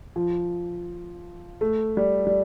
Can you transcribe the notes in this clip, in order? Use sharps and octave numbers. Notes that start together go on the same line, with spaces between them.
F3
A3
G3
G3